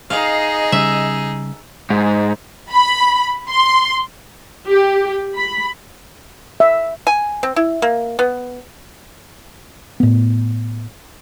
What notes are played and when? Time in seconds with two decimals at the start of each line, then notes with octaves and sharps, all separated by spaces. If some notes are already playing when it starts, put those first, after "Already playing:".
0.10 D#4 G#4 D#5 F5
0.72 C#3 G3 E5
1.90 G#2
2.73 B5
3.48 C6
4.67 G4
5.36 B5
6.60 E5
7.07 G#5
7.43 C4
7.56 E4
7.82 A#3
8.19 B3
10.00 A2 B3